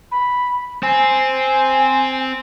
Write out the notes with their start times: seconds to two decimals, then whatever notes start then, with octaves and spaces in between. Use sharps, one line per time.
0.12 B5
0.83 C4 G#5